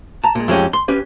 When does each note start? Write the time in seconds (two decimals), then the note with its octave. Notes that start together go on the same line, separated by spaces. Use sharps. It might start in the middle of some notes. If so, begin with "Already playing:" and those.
0.24 A5 A#5
0.35 A#2 G#3
0.48 F2 G#3 C#4 G4
0.73 C6
0.88 C#4 G4 B4